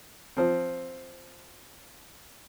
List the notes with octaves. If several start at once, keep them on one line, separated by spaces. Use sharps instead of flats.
F3 C4